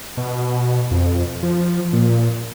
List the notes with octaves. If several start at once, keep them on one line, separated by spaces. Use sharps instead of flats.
B2
F2
F3
A#2